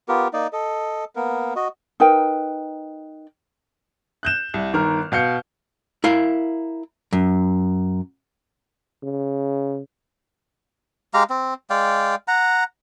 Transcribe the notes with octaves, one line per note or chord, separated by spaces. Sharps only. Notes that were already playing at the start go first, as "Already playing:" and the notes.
B3 F4 G4 A#4
A#3 D#4 D5 D#5
A4 D#5
A#3 B3 A#4
F#4 D#5
D#4 A#4 B4 G5
F#6 G6 E7
C2
G1 D#3 A#4 F6
B2 F5 G6 C#7
E4 A#4 F5
F#2
C#3
G#3 G4 F5 A#5
C4
G#3 D5 F5 G5
F#5 A#5